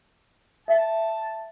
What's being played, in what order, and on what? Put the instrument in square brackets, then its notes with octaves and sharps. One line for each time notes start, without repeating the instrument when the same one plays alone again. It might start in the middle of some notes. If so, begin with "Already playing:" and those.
[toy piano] E5 [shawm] A5